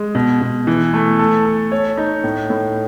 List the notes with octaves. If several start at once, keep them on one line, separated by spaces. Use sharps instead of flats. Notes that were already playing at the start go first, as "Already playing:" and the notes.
Already playing: G#3
B2
B2
E3
A3
A4
A4
C#5
D#4
A2
A2